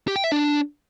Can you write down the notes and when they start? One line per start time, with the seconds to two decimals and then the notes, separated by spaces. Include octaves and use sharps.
0.08 G4
0.16 G5
0.24 E5
0.32 D4